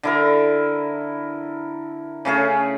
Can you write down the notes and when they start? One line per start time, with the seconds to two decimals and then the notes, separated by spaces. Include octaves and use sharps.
0.03 D3 E4 A#4
2.25 C#3 A3 C#4 G#4